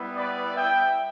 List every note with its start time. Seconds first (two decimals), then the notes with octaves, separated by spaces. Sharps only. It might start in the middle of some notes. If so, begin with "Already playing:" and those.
Already playing: G3 B3 E4
0.15 B4 D5
0.56 E5 G5